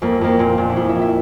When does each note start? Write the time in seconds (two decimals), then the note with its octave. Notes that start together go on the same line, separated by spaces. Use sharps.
0.02 F2 A#3
0.21 F2 A#3
0.39 A#2 C4
0.58 A#2 D4
0.70 E4
0.76 F2 F4
0.89 E5
0.95 F2
1.02 E5